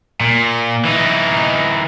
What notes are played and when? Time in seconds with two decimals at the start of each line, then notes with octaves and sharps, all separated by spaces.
0.21 A#2
0.85 E3 D#4